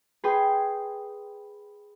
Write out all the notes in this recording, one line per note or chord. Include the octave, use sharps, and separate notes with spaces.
G#4 B4 G5 G#5 C6 D#6